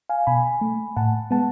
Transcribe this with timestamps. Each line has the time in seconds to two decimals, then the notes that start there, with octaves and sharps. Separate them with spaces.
0.09 F5 G#5
0.27 B2 G#5 B5
0.61 A3
0.96 A2 F#5 A5
1.31 G#3 B3 F#5 A5